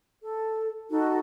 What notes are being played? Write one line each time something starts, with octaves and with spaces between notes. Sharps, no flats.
A4
D#4 F#4 A4